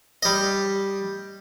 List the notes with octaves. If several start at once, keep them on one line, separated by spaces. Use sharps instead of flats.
G3 D#5